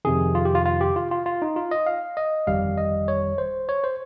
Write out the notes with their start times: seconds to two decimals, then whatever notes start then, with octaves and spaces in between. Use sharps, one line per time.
0.05 F2 C3 D#3 G#4
0.35 F4
0.45 G4
0.55 F4
0.66 F4
0.81 G4
0.96 F4
1.11 F4
1.26 F4
1.42 D#4
1.56 F4
1.71 D#5
1.87 F5
2.17 D#5
2.47 G1 F2 D#3 G3 F5
2.78 D#5
3.08 C#5
3.38 C5
3.69 C#5
3.84 C5